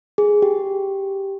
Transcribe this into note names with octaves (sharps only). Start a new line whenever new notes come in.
G#4
G4